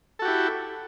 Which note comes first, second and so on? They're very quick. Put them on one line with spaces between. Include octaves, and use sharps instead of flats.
A4 F#4 G4 E4